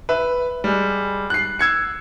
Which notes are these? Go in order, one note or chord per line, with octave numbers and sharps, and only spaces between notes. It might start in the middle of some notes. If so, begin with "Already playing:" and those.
B4 E5
G3 G#3
F#6 C7
E6 G#6 C#7